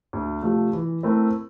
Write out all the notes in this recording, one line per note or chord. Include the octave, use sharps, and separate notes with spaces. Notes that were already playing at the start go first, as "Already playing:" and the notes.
D2
C3 F3 A3
E3
A3 C4 E4 A#4